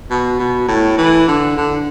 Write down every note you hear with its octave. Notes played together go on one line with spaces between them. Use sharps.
B2
B2
A2
E3
D3
D3